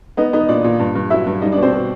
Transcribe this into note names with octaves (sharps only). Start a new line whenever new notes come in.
B3 D#4 D#5
B3 D#4 D#5
A#2 D4 D5
A#2
G2
G2
F#3 E4 E5
G2
G3 D#4 D#5
D4 D5
B2
C4 C5
B2